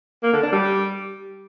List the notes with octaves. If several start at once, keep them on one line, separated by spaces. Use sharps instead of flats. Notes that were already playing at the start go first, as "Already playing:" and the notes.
A#3
D3
D4
G3